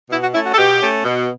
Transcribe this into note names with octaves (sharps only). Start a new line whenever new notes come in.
B2 E4
F#4
A3 C#4 E4
F#4
A4
B2 G4
A3 C#4
B2